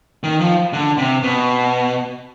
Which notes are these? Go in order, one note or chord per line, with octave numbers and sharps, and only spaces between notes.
D#3
F3
D3
C3
B2